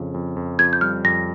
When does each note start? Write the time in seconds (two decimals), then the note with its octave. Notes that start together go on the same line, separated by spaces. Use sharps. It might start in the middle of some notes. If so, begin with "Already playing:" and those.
Already playing: F2 C#3
0.14 F2
0.37 F2
0.59 F2 G#6
0.73 G6
0.81 G3 F6
1.04 F2 A#6